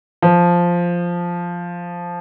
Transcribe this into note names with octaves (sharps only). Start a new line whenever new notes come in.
F3